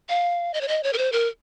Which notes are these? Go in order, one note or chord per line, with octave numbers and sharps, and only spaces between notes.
F5
D#5
C#5
D#5
C#5
A#4
C5
A#4